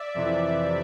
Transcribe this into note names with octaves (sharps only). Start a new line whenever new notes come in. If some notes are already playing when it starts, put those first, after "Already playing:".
Already playing: D5 E5
F2 C3 E3